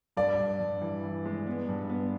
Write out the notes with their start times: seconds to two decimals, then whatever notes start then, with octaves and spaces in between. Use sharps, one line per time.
0.17 G2 D5
0.39 G2
0.60 G2
0.82 E3
1.03 E3
1.25 G#3
1.47 B3
1.68 G2
1.90 B3